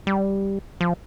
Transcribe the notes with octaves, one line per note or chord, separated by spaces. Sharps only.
G3
F3